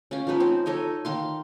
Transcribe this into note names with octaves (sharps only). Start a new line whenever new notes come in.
C#4 F5 G5
F3 B3 D#4 B4
C4 C5
D#4 A4 C#5 D#5
D#3 F5 C6